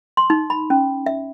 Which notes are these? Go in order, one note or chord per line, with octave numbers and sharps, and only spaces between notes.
C6
D#4
B5
C#4
E5